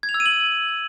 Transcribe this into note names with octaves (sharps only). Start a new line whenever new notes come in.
G#6
F7
E6
D#7
F#7